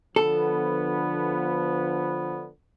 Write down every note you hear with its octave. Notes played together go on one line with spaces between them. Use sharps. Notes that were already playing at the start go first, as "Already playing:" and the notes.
D3 F3 B3 A4